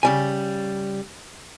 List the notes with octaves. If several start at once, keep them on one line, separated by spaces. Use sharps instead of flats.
C#3 G3 G#5